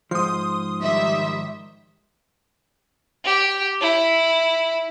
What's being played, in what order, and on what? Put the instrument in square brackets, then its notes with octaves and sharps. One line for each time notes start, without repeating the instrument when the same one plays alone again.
[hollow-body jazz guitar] G#2 F3 [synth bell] C6 D#6
[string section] D#3 G3 E5
[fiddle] G4
E4